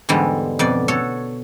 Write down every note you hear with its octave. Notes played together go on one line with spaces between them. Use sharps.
E2 G#2 D3 G3 G#3
F2 B2 D5
F#4 A4 C#5